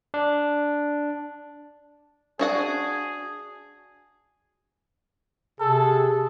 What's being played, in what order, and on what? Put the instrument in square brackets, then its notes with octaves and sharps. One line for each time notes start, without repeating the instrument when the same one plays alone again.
[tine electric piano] D4
[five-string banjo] D4 F#4 F#5 [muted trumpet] G#4
[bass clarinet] C3 [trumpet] G#4 [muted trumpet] A4